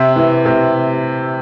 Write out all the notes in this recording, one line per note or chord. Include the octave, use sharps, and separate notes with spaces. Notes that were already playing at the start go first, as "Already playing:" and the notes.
Already playing: C3 E5
E3
C3